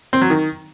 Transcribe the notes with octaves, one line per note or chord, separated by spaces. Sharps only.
C4
F#3
D#3